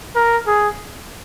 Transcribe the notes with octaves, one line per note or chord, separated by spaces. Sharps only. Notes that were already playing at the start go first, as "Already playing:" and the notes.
A#4
G#4